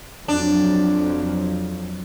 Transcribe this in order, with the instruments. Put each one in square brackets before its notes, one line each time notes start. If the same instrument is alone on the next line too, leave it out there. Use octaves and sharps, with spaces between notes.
[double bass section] F2 F3 F#3 [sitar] D4